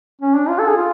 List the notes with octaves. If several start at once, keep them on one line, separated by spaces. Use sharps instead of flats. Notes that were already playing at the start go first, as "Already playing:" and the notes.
C#4
D4
F4
A4
G#4
F4